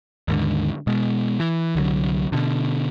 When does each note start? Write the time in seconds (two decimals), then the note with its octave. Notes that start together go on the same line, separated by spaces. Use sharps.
0.28 D#2 G#2 D3
0.87 B2 G#3
1.40 E3
1.75 C2 D3 D#3 F#3
2.32 B2 D3